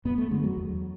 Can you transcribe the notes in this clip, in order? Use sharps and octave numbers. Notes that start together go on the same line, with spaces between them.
F#2 B3
A3
D3 G#3
F#3
E2